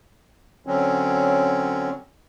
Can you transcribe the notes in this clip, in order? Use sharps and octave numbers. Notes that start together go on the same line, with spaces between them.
D3 F#3 C4 C#4